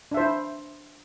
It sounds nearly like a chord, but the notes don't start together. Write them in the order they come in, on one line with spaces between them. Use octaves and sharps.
D4 E5 C5 E4